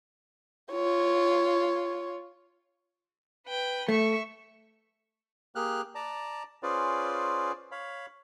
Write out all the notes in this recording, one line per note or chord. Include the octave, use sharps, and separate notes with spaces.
F4 C#5
B4 G5
A3 E5 C#6
A#3 G4 G#4 F6 F#6
D5 A5 A#5
C#4 F4 G#4 B4 C5 D5
C#5 F5 B5